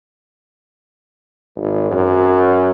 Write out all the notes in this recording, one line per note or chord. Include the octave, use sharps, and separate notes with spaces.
G#1
F#2